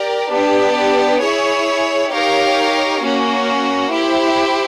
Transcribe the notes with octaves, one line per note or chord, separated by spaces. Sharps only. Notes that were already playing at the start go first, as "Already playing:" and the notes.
Already playing: G4 A#4 D5
B3 D4 G4
E4 G#4 C#5
D#4 G4 A#4 C#5 F5
A#3 C#4 F#4
E4 G4 C5